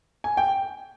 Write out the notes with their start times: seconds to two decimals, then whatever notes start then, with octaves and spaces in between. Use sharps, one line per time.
0.24 G#5
0.37 G5